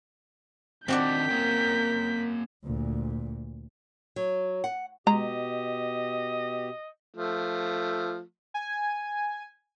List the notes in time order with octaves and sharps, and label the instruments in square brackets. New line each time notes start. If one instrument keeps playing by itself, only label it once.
[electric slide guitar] D#3 F3 D4 [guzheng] C4 F#4 D5 [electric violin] G6 B6
[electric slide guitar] A#3 C#4 G5 [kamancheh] A#4
[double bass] D2 A#2
[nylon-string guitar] F#3
F#5
[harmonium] B2 G4 [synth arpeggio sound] G#3 [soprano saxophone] D#5 [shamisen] A#5
[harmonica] F3 A3
[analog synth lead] G#5